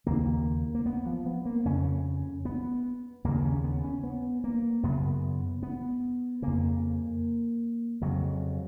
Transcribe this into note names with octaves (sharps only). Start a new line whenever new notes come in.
D#2 C#3 A#3
A#3
B3
F3
B3
A#3
F2 C#3 C#4
B3
D#2 C#3 A#3
C#4
B3
C#4
B3
A#3
F#2 C#3 B3
B3
F2 C#3 A#3
F2 C#3 F#3